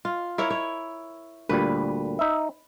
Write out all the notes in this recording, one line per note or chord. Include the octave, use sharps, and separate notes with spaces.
F4
E4 A#4 C#5
C#5
D2 A#2 G3 B4
D#4 E5